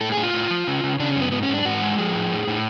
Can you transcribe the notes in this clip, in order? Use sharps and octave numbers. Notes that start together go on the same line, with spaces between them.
A2 A4
G#4
A2
F4
A2
F3
C#3
C#3
C#3 D4
C#4
F#2 B3
G#2 B3
C#4
G#2 D4
G#2 F#4
G#3
F3 G#4
A2
A2
A2